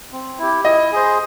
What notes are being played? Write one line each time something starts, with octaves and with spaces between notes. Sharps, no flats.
C4
E4 G4
E4 D#5
G#4 C5